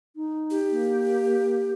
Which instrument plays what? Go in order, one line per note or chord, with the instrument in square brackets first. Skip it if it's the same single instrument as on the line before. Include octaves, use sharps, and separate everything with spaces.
[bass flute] D#4
[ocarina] G4
[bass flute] A#3